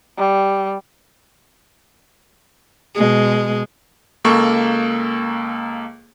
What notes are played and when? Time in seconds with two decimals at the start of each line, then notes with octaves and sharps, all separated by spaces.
0.17 G3
2.95 B2 G#3
4.25 C#2 A#3 A4 C#6